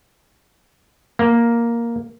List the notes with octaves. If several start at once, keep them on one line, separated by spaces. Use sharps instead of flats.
A#3